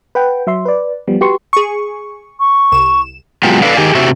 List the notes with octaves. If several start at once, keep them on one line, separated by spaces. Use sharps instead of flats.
B4 F#5 G5
F#3 E5 C6
B4 D5
F3 G3 B3
F#4 G4 B4 C6 C#6
G#4 C#6
C#6
C2 E7
B2 F#3 G#3 F4 G4
A4 B4 D5 F5
D#3 G4 G#4
C3 A3 F#4 G4 E5